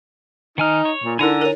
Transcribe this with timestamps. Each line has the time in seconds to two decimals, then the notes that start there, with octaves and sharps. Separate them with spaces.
0.58 D#3 D#4 G#5 F6
0.85 C#5
1.04 A#2
1.19 D3 D#4 E4 A#4 G#5 A#5
1.41 A#4 C#5